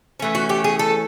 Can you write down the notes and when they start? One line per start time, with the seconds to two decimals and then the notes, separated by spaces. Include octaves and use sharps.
0.20 E3 A3 C#4
0.35 F#4
0.49 G4
0.64 G#4
0.79 A4